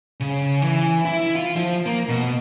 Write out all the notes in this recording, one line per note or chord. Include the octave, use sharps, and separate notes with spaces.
C#3
E3
E4
F4
F3
A#3
B2